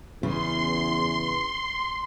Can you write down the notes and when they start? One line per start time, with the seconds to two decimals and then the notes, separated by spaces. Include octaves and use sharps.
0.23 E2 C#3 B3 C#4 C6